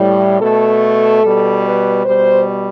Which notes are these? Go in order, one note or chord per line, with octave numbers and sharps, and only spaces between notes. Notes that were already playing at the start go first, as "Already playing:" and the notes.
Already playing: A2 G3
B2 A3 A4
B2 G3
B4
B2 G3 C5